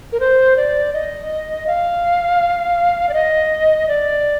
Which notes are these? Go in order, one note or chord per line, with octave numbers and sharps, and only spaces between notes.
A#4
C5
D5
D#5
F5
D5
D#5
D5